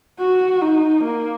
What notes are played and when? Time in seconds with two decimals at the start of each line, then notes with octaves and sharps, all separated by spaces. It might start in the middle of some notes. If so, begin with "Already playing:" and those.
0.19 F#4
0.62 D#4
1.04 A#3